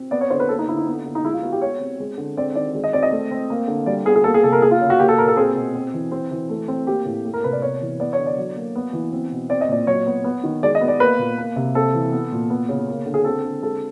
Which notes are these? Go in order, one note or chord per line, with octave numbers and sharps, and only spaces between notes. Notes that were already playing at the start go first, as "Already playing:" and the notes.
Already playing: C4
B3 D5
C#5
D3 C5
B4
A#3 A4
D#4
D3 E4
D#4
B3
D3
D#4
G#3 E4
F4
B3 F#4
G4
G#3 C#5
C4
G#3
D3
C4 D5
D#3 D5
G#3
D#5
C4 D5
D#5
A3
C4
A#3
D3
G3 D5
B3 G#4
G#4
A#3 A4
G#4
C3 A4
A#4
A#3 G#4
F4
C#3
F#4
A#3 G4
A4
A#2 A#4
A4
C4 G#4
B2
C4
E3
C4
E3
A3
C4
A#3 G4
A2
A3
A#4
C3 B4
D5
B3 C#5
E3
B3 D5
C#5
D3
D5
F#3
A#3
B3
E3
C4
B2
C4 D5
D#5
A#2 D5
F#3 C#5
B3
B3
D#3
G#3 D5
D#5
B3
D5
A#3 B4
A#2
A#3
C3
C4 A4
E3
B3
A#2
B3
C#3
A#3
D3
G#4
C4 A4
D3
G#3 A4